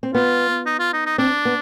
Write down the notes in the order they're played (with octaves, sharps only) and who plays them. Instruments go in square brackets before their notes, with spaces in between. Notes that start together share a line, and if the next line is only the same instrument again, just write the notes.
[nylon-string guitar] C4
[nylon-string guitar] B3 [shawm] F4
[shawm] D#4
F4
D#4
D#4
[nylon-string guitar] C4 [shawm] D4
[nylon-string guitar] B3